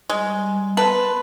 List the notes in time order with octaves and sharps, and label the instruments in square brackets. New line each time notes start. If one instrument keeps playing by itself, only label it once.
[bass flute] G3 [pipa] G#3
[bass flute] B3 [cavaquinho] B4 [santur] A5 C6